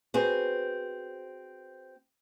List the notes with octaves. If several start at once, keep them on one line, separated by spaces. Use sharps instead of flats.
C4 F#4 G#4 B4 C5